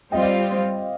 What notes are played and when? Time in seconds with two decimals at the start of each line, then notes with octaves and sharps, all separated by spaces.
0.11 G3 C4 F4 D#5 G5
0.22 D5 F5